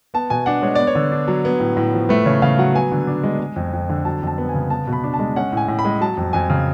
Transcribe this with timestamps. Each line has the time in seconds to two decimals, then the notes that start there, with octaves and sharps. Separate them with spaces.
0.14 B3 A5
0.30 B2 G#5
0.46 D4 F#5
0.62 G#3 C#5
0.75 B3 D5
0.87 C#5
0.95 D3
1.12 D4
1.28 F#3
1.45 B3
1.60 A2
1.77 A2
1.93 F3
2.09 A3 B4
2.26 C#3 C#5
2.42 C#3 F5
2.58 F#3 F#5
2.74 B3 G#5
2.92 D3
3.07 D4
3.23 G#3
3.39 G#3
3.56 F2
3.73 F2
3.90 D3
4.05 F#3 A5
4.22 F2 A5
4.38 B3
4.49 G#5
4.55 C#3
4.70 B3 A5
4.87 B2
4.93 B5
5.04 D4
5.14 A5
5.19 G#3
5.36 C#4 F#5
5.52 A2 G#5
5.68 A2
5.79 B5
5.85 G#3
6.01 F#3 A5
6.17 F2
6.33 F2 G#5
6.50 C#3